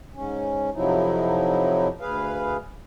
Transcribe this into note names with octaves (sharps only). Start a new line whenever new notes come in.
G#2 C#4
F2 C3 F3 F#3 D#4 E4
D2 G#4 B4 F5